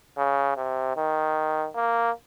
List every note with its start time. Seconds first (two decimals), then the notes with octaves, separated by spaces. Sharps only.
0.18 C#3
0.57 C3
0.97 D#3
1.75 A#3